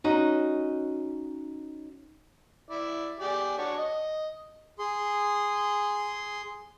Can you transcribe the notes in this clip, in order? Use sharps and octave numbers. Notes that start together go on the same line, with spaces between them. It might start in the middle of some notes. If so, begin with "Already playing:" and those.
C#4 D#4 F#4
E4 D5
G4 G#4 D5
D4 F#4 C#5
D#5
G#4 C6